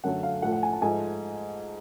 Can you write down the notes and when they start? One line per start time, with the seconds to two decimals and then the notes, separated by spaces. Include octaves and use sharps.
0.04 F#2 D3 F#3 A3 F#5
0.23 F5
0.42 A2 F3 A3 F#5
0.53 F#5
0.63 G#5
0.73 A5
0.82 G#2 F3 A3 G#5